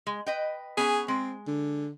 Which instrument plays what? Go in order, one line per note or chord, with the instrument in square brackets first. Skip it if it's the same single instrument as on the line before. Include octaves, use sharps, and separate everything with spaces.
[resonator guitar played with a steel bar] G#3
B4 D#5 G5
[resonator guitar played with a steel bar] B3 C#4 G#5 [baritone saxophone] G#4
[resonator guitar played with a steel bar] G#3 [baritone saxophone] C4
[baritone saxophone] D3